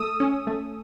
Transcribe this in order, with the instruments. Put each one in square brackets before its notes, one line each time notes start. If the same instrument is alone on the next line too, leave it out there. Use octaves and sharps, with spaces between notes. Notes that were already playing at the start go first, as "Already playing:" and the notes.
Already playing: [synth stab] A3 D#6 E6
C#4
A3